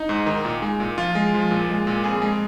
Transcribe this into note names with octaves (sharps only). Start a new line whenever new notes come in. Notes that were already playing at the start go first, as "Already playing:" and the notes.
Already playing: D#4
G#2
D#3
A#2
G#3
A#2
F3 F4
G#3
F3
A#2
G#3
A#2
F2 G#4
G#3